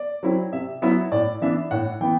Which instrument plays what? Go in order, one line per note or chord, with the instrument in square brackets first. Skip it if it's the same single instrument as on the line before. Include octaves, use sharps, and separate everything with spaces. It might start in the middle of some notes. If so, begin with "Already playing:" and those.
Already playing: [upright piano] D5
F#3 C4 E4
C3 E5
F#3 B3 E4 E5
A2 D5
E3 B3 D4 E5
A2 F#5
E3 B3 G5